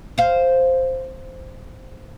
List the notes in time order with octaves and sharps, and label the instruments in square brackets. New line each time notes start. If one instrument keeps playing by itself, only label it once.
[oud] C5 F5